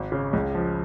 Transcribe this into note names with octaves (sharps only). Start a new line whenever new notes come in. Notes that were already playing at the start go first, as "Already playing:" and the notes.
Already playing: G#1
C#3
C#2
F3